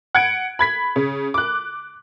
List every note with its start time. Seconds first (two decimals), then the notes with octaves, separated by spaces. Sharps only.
0.15 F#5 G#6 D7
0.59 B5 G#6 B6
0.96 C#3
1.34 D6 F#6